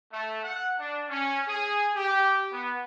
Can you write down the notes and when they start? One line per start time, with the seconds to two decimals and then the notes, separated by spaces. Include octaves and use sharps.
0.12 A3
0.43 F#5
0.78 D4
1.09 C#4
1.47 G#4
1.95 G4
2.51 B3